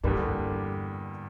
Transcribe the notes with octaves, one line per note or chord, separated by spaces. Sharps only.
E2 G2 D3 G3 A#3 D4